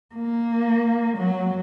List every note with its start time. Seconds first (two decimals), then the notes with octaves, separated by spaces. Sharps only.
0.15 A#3
1.17 F#3